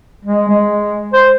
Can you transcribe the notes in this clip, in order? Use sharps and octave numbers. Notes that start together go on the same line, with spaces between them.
G#3
G#3
C5